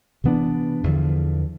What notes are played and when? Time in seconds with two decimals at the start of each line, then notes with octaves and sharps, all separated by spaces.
0.24 C3 E3 B3 D4
0.84 E2 D3 F3